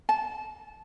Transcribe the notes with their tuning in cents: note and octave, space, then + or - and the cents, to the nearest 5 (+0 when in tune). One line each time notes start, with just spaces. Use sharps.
A5 -20